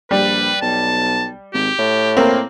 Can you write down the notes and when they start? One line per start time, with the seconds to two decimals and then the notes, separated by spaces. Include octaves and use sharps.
0.11 A#1 G3 B4
0.62 B1 A5
1.54 G#1 G4
1.78 A2
2.17 A#3 C4